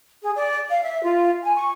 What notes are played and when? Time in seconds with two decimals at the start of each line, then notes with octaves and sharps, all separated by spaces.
0.22 G#4
0.35 D5
0.69 F5
0.81 E5
1.02 F4
1.41 G#5
1.55 C#6